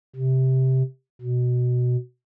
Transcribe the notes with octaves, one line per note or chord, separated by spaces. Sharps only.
C3
B2